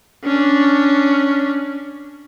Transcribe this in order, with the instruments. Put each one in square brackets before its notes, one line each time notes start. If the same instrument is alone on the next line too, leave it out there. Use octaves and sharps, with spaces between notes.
[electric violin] C#4 D4